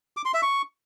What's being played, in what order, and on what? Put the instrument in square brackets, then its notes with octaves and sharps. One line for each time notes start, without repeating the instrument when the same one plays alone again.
[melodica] D6
C6
E5
C#6